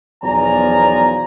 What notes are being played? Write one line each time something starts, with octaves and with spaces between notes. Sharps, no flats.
B1 E2 F3 D5 G#5 A#5